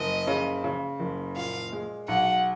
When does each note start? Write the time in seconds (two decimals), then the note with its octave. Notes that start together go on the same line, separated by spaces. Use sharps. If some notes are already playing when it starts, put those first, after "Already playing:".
Already playing: F#1 D#5
0.28 C#3
0.64 C#3
1.00 F#1
1.36 A#2 F5
1.72 G#3
2.08 B1 F#5